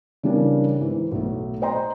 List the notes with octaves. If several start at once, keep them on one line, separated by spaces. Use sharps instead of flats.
C#3 E3 G3 D4 A#4
G#2 E3
B1 A3
C5 D#5 G5 A#5 C6